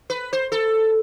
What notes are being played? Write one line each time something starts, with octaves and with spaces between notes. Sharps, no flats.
B4
C5
A4